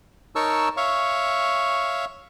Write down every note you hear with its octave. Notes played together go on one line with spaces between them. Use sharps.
D#4 A#4 C#5 A5 C#6 E6
C#5 E5 F5 C#6